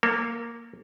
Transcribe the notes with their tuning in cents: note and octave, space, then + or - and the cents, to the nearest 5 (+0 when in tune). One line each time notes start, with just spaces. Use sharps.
A#3 +0 A4 +40